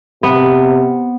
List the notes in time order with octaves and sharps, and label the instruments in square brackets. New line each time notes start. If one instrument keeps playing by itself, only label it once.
[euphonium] C3 [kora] B3